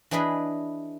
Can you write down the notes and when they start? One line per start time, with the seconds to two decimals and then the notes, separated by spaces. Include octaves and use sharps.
0.11 E3 D4 G#4 B4 D#5